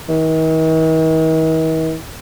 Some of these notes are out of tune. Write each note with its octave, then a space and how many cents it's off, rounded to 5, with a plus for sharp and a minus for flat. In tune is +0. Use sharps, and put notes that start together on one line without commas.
D#3 +45